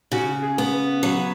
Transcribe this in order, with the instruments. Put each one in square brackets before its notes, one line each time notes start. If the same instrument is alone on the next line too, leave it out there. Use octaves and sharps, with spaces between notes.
[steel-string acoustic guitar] C#3 [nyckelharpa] F#4
[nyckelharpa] G#4
[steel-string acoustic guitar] B3
[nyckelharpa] B4
[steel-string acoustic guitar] F#3 [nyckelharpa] B4